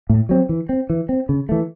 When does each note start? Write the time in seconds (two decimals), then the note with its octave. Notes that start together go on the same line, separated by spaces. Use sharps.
0.10 A2
0.29 F#3 C4
0.49 E3
0.69 C4
0.90 E3
1.09 C4
1.29 C#3
1.49 E3 A3